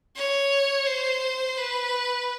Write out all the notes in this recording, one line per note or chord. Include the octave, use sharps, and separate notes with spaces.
C#5
C5
B4